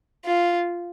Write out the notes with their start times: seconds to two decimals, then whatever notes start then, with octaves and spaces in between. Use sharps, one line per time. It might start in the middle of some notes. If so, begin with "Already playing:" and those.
0.25 F4